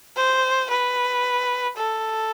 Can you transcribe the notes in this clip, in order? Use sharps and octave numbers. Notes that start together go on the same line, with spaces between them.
C5
B4
A4